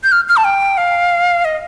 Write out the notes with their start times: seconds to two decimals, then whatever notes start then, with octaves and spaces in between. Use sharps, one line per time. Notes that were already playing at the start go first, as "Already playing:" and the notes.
0.03 G6
0.12 F6
0.28 F6
0.37 A5
0.44 G5
0.77 F5
1.45 D#5